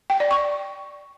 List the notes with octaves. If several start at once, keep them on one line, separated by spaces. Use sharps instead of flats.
G5
D5
C#6